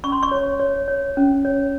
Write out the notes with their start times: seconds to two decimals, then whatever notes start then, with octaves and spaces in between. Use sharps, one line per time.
0.04 C#4 C#6
0.12 C6
0.23 C#6
0.31 C#5
0.60 C#5
0.88 C#5
1.17 C#4
1.45 C#5